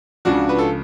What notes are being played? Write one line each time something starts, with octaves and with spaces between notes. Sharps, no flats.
C#2 C#3 F3 D4 F#4
B4
A4